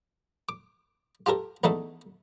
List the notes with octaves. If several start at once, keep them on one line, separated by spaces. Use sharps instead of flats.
D6
F4 G4 A4 A#4
E2 D3 A3 D#4 A4